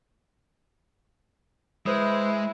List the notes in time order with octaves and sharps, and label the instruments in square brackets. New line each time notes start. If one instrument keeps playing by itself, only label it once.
[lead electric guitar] G#3 [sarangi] E4 [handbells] B4 C5 D#6